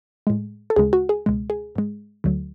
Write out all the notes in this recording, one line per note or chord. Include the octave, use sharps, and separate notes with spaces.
A2 G#3
A4
D2 C#3 G#3 G#4
F#4
G#4
C#2 B2 G#3
G#4
G#2 G#3
D2 D3 F#3 A3